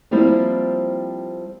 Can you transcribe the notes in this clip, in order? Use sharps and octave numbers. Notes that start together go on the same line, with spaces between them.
F3 G3 A#3 C4 E4